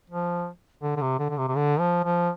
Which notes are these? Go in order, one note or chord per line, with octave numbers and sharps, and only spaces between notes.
F3
D3
D3
C3
D3
D3
C3
C3
D3
F3
F3